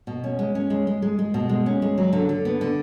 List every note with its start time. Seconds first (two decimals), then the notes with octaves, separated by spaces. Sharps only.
0.07 B2
0.24 C#4
0.39 G#3
0.55 C#4
0.70 G#3
0.87 G#3
1.02 G#3
1.19 G#3
1.34 B2
1.49 G#3
1.66 C#4
1.82 G#3
1.98 F#3
2.13 D3
2.29 D3
2.45 B3
2.61 D3